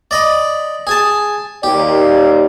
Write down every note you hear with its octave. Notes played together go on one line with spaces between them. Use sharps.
D5 D#5 B5
G#4 G#5 A5
D#2 G4 D5